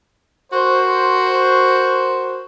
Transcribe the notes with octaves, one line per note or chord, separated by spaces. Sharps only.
F#4 A#4 C5